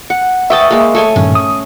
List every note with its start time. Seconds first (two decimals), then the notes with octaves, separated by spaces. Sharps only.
0.10 F#5
0.50 B4 E5 G5 A5 C#6 D#6
0.71 G#3 A#3
0.95 A3 C#5 G#5
1.16 G2 A#2 D#3 C#4
1.35 D#6